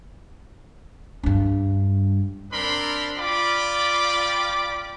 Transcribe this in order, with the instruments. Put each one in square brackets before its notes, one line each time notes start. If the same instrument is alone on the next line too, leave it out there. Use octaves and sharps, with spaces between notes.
[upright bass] G2 D4
[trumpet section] C4 D4 A#4 B5 C6
F4 D5 G5 B5 D6